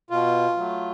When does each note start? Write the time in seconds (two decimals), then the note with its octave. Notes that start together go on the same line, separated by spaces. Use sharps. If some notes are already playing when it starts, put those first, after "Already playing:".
0.10 B2 F4
0.57 F#3 A3